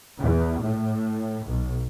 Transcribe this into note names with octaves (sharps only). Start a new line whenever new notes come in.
E2
A2
B1